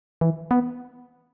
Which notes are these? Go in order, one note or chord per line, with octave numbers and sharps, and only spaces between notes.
E3
B3